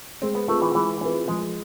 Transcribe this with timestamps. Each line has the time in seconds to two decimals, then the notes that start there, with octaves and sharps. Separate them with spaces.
0.22 G#3 C4
0.35 B3
0.48 A3 C4 F4 G#4 B4
0.62 E3
0.75 E3 G#3
1.01 E3 C4 F4 G#4 B4
1.28 F3 G#3